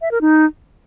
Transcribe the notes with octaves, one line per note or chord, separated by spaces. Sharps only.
E5
A#4
D#4